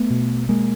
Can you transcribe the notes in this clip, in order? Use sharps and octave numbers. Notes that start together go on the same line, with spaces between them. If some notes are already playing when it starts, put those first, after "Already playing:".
Already playing: A3 B3
B2
G#3 A#3